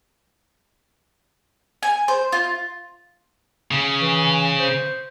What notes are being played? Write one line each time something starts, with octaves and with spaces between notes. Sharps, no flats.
G#5
C5
F4
C#3
E3
C5